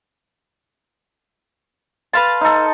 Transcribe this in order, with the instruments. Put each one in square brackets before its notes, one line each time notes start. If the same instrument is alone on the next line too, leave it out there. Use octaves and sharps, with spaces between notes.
[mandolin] B4 F5 A5 [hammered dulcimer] C6
[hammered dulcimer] D#4 A4